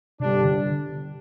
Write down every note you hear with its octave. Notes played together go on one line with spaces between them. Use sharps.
G1 G2 C3 G3 D4
D3